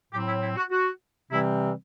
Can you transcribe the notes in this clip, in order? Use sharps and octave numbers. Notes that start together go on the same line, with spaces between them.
A2 F#3 C4 G4
E4
E4
F#4
F#4
C3 E3 G3 C4 E4